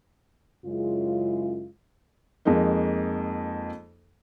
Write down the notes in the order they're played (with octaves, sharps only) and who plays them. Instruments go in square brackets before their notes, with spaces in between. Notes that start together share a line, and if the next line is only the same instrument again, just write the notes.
[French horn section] F#2 C#3 G#3 E4 F4
[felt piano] F2 G#3 A#3 D#4